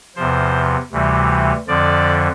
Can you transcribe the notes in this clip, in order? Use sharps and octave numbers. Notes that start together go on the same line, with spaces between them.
E2 C3 F3 C5
D2 C3 E3 G3
F2 D3 F3 D5